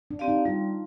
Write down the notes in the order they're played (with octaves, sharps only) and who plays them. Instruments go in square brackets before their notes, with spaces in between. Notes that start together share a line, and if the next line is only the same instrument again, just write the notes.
[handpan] D4
[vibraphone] C4 G4 D5 F5
[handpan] D#4
[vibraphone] G3 [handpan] F4